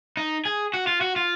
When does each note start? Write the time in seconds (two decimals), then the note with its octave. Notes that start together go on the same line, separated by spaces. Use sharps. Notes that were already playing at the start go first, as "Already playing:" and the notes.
0.17 D#4
0.45 G#4
0.74 F#4
0.87 F4
1.01 F#4
1.16 F4